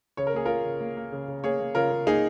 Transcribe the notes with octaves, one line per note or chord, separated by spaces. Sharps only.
C#3 C#5
A#4
A#3 G#4
A#3 F4 A#4
C#3
A#3
A#3
C#3
C#3
A#3 G#4 C#5
A#3
C#3 F4 A#4
C#3
A#3 D#4 G#4